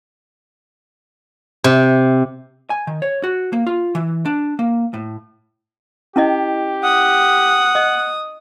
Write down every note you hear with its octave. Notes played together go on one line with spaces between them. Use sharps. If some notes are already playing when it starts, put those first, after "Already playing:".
C3
G#5
D#3
C#5
F#4
A#3
F4
E3
D4
A#3
A2
C#4 E4 G4 D#5
F#5 D#6
D#5